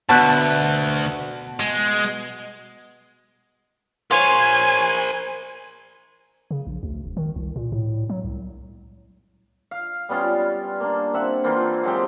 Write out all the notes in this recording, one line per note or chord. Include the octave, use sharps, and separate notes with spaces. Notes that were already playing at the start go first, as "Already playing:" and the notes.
D2 B2 A5 F#6
G#3
F4 A#4 C5 C#5 G#5
C#3
A#1
D2
E1
D#3
C2
A#2
A2
F#3
C2
F5
G3 B3 C#4 F4
A#3 D4
C4 E5 F#5
E3 A#3 F4 C5
F#3 G#3 C4 G4